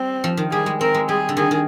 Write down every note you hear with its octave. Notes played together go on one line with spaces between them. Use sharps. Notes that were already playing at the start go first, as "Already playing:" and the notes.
Already playing: G3 C4
F3
D#3
G3 G#4
G#3
C4 A#4
G#3
G3 G#4
D3
D#3 G#4
D#3